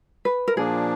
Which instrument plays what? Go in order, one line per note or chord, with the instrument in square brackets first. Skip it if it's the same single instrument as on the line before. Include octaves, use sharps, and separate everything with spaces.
[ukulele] B4
A#4
[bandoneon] A#2 F3 A#3 D4 [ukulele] G#4